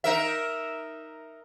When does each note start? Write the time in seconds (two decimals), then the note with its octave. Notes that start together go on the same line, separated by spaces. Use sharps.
0.04 D#4 A#4 E5